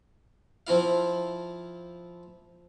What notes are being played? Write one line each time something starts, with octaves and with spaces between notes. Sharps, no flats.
F3 C4 E4 F5